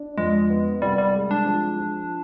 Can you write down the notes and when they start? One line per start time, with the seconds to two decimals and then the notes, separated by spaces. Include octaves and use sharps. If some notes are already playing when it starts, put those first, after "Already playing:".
Already playing: D4
0.18 F2 G#3
0.50 B3
0.82 C2 G3
0.98 G3
1.15 G#3
1.31 D4
1.46 F3
1.78 F3